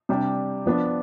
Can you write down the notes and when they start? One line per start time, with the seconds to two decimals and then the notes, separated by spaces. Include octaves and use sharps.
0.09 C3 G3 D4 G4
0.66 F3 B3 D4